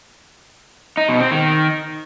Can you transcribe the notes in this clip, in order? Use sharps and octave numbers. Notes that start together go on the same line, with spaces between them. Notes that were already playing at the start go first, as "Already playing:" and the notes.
D#4
B2
C4
D#3